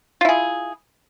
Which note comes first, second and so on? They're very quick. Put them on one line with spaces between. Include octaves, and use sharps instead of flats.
F4 E4 G#4